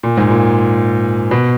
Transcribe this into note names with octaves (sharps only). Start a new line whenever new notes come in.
A#2
G#2
A#2
B2